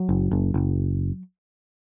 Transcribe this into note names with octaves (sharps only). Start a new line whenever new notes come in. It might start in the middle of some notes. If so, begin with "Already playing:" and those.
Already playing: F#3
F#1
F#1
F#1